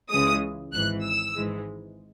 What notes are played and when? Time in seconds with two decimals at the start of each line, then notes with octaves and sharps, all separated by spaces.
0.11 C#2 C#3 E3 G#3 D#6
0.73 G#1 G#2 E3 F#6
1.04 E6
1.36 G#1 G#2 E3 G#3